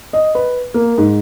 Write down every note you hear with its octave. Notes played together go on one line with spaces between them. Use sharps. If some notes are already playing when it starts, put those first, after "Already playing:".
D#5
B4
A#3
G#2